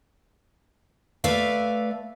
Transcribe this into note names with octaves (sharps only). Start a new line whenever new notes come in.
A3 B4 D5 E5 F5